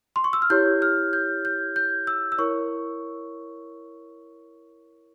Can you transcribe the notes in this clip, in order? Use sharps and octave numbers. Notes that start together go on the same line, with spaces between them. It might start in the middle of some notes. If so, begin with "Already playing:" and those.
C6
C#6
E6
F6
E4 G4 C#5 G6
F6
G6
G6
G6
E6
E6
E4 A#4 C#5 C#6